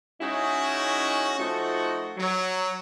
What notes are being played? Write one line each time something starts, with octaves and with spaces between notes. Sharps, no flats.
G#3 C#4 D#4 E4 F#4
F3 A3 D#4 F#4
F#3